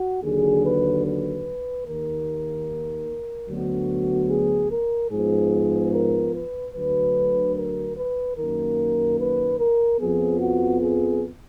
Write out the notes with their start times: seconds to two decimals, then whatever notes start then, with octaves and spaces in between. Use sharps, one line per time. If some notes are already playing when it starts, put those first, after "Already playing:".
Already playing: F#4
0.23 D#2 D3 F#3 G#4
0.65 B4
1.05 B4
1.87 D#2 D#3 A#3 A#4
3.49 D2 D3 F#3 B3 F#4
4.30 G#4
4.72 A#4
5.12 G#2 F3 B3 G#4
5.93 A#4
6.35 B4
6.74 D2 D3 F#3 B4
7.56 A#4
7.97 B4
8.38 F#2 D#3 A#3 A#4
9.19 B4
9.60 A#4
10.00 F2 F3 B3 G#4
10.41 F#4
10.81 G#4